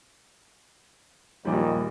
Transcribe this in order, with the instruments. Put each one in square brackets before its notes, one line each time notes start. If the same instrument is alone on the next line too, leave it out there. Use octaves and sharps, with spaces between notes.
[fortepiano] A#1 G3 [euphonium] D#2